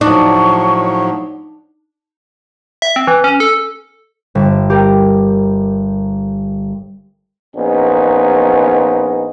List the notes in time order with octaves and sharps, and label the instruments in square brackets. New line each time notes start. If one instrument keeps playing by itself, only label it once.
[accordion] A2 F3 F#3 [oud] D4 [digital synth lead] D#4 [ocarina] C#6
[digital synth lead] E5
C4
E3
C#4
A4
[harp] G1
G4 A#4
[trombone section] A#1 B3 C#4 D#4